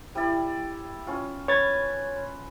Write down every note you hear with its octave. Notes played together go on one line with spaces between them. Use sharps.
G3 E4 D5
C#4 F4
B4 C#5 B5 G#6 A6